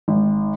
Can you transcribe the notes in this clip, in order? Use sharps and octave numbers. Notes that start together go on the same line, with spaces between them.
G#1